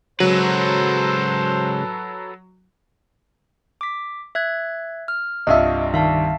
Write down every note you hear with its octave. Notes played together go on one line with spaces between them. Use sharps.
C#3 F#3 G#3 A4 B4 C5
D6 B6
E5 F#6 G#6
F6
C2 G2 F4 D#5 E5
D#3 E5 F5 A5